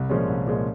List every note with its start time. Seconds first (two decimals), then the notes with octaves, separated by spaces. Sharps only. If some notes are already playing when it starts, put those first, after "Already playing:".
Already playing: C2
0.09 A#2 F3 G#3 C#4
0.28 C2
0.46 A#2 F3 G#3 C#4